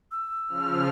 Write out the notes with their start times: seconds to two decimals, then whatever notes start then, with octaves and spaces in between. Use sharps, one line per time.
0.12 E6
0.48 C#3 F3 F6